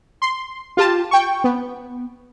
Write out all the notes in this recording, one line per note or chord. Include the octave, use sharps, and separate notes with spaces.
C6
F4 G4 A5
G5 C#6
B3